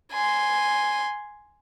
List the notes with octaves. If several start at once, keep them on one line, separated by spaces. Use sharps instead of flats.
G#5 C6